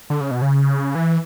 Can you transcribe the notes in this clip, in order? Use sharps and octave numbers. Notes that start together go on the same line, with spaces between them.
D3
C#3
B2
C#3
E3